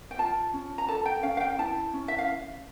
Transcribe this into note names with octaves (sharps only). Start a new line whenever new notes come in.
G5
F4 A5
C#4
A#5
A4 A5
G5
C#4 F5
F5
G5
E4 A5
C#4
E5
F5